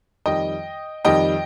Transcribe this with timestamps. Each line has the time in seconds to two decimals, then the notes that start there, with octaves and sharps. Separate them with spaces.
0.26 F2 D#3 G3 D#5 G5
1.05 F2 D#3 G3 D#5 G5